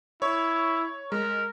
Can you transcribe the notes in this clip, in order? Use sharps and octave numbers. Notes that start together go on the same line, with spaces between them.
E4 C#5
G#3 A#4